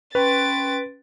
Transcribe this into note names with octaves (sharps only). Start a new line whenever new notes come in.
C#4 B4 G5 C6 A6 D7